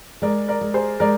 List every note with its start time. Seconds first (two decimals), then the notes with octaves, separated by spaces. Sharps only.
0.22 G#3 A#4 D5
0.48 A#4 D5
0.61 G#3
0.74 G#4 C5
1.00 G#3 A#4 D5